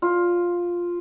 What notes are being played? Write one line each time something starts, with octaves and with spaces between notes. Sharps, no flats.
F4